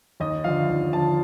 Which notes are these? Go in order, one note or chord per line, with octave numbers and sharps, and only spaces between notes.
D#2 D#5
D3 F3 F5
D#2
D3 F3 A5